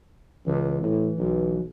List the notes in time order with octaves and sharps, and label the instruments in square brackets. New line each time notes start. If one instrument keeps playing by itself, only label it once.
[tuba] C#2 [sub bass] E3
[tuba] A2
B1